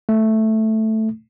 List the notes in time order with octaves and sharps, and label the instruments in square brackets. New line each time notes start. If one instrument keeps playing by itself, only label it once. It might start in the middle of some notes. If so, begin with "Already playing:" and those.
[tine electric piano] A3